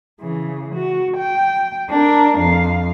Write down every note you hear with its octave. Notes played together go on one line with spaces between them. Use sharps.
C#3 E3
F#4
G5
D4 A#4
F2 F5